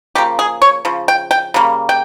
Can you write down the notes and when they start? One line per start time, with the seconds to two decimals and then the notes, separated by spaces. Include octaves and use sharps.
0.15 C#3 F3 A#3 G4
0.39 G#4
0.62 C#5
0.85 C#3 F3
1.08 G5
1.31 G5
1.54 C#3 G3 A#3
1.89 G5